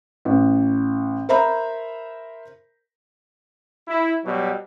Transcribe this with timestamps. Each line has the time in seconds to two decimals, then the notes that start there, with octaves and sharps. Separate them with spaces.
0.25 A1
1.29 A#4 C5 E5 A#5 B5
3.88 E4
4.24 B2 F#3 G3